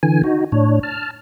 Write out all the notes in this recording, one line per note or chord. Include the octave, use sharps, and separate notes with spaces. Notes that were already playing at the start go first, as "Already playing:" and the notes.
D3 E3 G#5
D#4 F#4
A2 D4 C#5
A5 F6